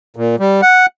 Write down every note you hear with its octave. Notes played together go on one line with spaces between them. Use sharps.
A#2
G3
F#5